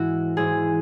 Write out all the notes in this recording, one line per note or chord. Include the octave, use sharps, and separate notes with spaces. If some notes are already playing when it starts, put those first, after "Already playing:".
Already playing: G#2 E3 G#3 E4 F#4
G#2 E3 G#3 G#4